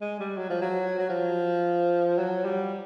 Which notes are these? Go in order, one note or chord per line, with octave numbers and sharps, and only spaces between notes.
G#3
G3
F#3
F3
F#3
F#3
F3
F#3
G3